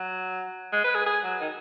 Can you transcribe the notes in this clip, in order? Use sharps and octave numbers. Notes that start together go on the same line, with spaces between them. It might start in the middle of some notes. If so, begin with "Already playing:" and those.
Already playing: F#3
G#3
B4
G#4
G#4
F#3
D#3